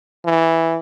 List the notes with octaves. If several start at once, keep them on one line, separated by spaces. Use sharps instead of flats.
E3